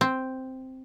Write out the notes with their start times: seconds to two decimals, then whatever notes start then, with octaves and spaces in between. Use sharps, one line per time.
0.01 C4